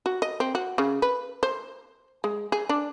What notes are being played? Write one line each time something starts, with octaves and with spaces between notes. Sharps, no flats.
F#4
D#5
C4
F#4
C#3
B4
C5
G#3
G#4
D4